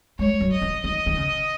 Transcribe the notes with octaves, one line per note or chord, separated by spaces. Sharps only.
G#3 C#5
F#3
D#5
E3
D#3 D#5
D#3
C#3